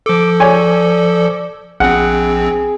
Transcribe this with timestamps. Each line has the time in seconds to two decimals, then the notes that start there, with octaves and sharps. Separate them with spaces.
0.06 F3 A4 D6
0.40 C#5 D5 G#5
1.80 A#1 C4 G#4 F#5